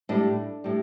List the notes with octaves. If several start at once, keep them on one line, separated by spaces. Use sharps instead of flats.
A2 G3 D4
A2 G3